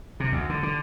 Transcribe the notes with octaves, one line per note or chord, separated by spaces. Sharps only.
C3
D2
D3
D3